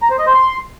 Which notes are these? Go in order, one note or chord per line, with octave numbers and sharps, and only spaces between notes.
A#5
C5
D#5
C5
C6